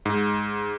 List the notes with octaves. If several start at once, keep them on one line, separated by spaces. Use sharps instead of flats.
G#2